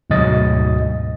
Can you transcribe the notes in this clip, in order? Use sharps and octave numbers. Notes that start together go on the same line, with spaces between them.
D2 G#2 B2 F#3 D#5 A6